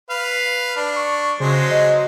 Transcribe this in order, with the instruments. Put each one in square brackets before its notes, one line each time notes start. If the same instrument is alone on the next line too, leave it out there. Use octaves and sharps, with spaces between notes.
[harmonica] B4 F5
D4
[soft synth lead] C#6
[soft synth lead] C#3 [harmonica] F#3 G#3 C5
[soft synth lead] D#5